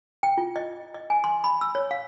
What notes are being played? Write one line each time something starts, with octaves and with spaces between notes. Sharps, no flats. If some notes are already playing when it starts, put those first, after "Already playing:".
G5
F4
D#5
D#5
G#5
C6
B5
E6
C#5
F5